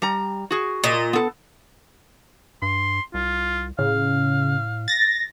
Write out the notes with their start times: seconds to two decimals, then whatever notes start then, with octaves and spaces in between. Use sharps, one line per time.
0.02 G3 A#5
0.51 F#4 G#4
0.84 A#2 D#5
1.13 B3 A4
2.62 G2 C6
3.14 C2 F4
3.79 A2 C#3 F5
4.88 A6 A#6